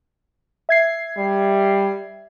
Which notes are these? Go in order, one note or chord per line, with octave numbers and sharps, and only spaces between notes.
E5 G#6 C7
G3